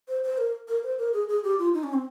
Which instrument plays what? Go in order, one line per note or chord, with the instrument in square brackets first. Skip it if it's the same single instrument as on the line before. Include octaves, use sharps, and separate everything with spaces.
[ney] C5
C5
A#4
A#4
C5
A#4
G#4
G#4
G4
F4
D#4
C#4
C4